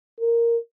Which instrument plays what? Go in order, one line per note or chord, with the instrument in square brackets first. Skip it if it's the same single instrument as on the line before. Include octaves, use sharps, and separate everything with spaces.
[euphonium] A#4